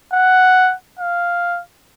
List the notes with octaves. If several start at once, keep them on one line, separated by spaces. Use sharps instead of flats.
F#5
F5